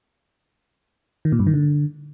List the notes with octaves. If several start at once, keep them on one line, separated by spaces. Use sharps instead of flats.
D#3
A#2
G2
D#3
D3